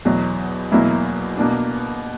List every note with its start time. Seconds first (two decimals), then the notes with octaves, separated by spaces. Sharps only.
0.05 E2 B2 F#3
0.72 E2 B2 F#3 A#3 E4
1.37 B2 A#3 D4